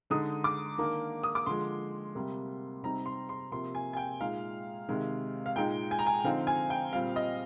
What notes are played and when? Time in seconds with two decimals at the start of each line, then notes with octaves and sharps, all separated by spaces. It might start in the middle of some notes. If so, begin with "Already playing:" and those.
0.10 D3 G#3 D#4 D#6
0.44 D6
0.78 D#3 A#3 D4
1.23 D#6
1.35 D6
1.46 D3 F3 G#3 C6
2.15 C3 G3 A#3
2.83 C3 G3 C4 D#4 A#5
3.06 C6
3.29 C6
3.52 C3 F3 A#3 C6
3.75 G#5
3.93 G#5
3.97 G5
4.20 A#2 G#3 D#4 F5
4.88 C3 D#3 G#3
5.46 F5
5.56 A#2 G#3 D#4 G5
5.91 G#5
5.99 A#5
6.07 G#5
6.24 D3 F3 C4 D#4 F5
6.47 G#5
6.70 G5
6.93 A#2 G3 C4 F5
7.16 D#5